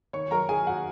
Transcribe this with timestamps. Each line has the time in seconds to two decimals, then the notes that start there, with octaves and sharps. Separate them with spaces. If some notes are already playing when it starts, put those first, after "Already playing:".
0.13 D#3 C#5 C#6
0.31 F#2 A#4 A#5
0.49 D#3 G#4 G#5
0.67 F#4 F#5